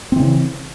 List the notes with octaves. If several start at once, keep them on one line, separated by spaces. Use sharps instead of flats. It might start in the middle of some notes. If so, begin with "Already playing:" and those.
C#3 E3 C4